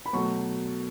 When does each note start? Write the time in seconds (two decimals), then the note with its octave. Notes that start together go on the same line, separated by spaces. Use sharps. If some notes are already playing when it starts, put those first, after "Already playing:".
0.06 B5
0.13 B2 F#3 A3 C#6